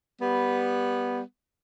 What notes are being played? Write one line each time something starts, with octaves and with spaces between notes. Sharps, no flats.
G3 B3